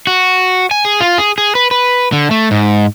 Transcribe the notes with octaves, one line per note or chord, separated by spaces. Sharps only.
F#4
G#5
G#4
F4
G#4
G#4
B4
B4
D3
A3
G#2